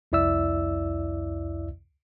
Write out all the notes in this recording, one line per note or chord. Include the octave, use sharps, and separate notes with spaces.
C2 F2 E4 D5 E5 E6